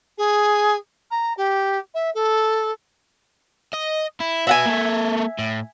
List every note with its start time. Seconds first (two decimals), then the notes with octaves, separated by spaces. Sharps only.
0.18 G#4
1.11 A#5
1.37 G4
1.94 E5
2.14 A4
3.73 D#5
4.20 E4
4.47 F#4 B4 E5 F#5 G#5
4.65 A#3 A4
5.39 A2